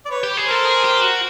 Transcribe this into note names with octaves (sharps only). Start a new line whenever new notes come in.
D5
B4 C#5
G4
G#4
A4 A#4 C5
G#4
G4
F#4